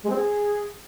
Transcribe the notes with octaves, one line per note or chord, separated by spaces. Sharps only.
G#3
C4
G#4